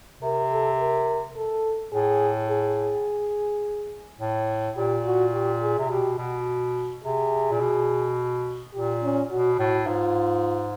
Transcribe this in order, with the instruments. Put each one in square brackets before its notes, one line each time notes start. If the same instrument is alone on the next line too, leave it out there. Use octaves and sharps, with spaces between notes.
[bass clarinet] C3 [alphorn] A#4
[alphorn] A4
A#4
A4
[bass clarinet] A2 [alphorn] G#4
[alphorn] G#4
[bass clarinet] A2
[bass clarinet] A#2 [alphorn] G4
[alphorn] F#4
G4
G#4
[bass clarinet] C3
[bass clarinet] B2 [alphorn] G4
[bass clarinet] B2 [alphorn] F#4
[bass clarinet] C3 [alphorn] G#4
[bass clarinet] A#2
B2
[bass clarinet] A#2 [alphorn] G4
[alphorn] C#4
[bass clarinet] B2 [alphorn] F#4
[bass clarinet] A2 [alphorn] F#4
[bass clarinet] G#2 [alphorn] F4